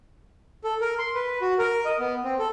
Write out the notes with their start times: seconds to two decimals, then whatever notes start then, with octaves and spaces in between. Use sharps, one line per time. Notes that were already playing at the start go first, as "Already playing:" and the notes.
0.64 A4
0.81 A#4
0.99 C6
1.14 B4
1.41 F#4
1.59 A#4
1.85 D#5
1.99 B3
2.24 C4
2.39 A4